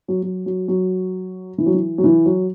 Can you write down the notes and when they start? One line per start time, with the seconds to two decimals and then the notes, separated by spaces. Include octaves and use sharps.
0.08 F#3
0.22 F#3
0.46 F#3
0.68 F#3
1.58 E3
1.66 F#3
1.74 E3
1.98 F#3
2.04 E3
2.26 F#3